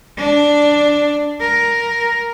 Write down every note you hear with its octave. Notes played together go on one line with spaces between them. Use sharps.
D4
A#4